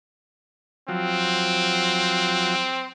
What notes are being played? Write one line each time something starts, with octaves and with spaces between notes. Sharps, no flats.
F3 F#3 C4